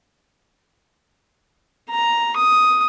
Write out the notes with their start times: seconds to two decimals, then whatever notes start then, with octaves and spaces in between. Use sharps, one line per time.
1.90 A#5
2.36 D#6